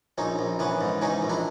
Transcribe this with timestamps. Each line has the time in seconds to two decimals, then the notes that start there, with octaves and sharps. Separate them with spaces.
0.18 A#1 C#4 D#4
0.39 A#1
0.59 E3 B3 C#4
0.81 G#2
1.02 E3 C#4 D#4
1.22 A#1
1.29 D4 E4